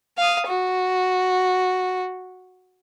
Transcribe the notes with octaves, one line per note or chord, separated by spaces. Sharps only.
F5 D#6
F#4